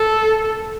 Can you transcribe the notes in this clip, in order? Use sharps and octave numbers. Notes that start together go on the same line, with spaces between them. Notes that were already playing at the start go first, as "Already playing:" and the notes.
Already playing: A4